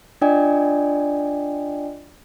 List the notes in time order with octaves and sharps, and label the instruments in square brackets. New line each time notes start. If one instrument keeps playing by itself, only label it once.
[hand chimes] D4 F4 D5 D#5 G5 G#5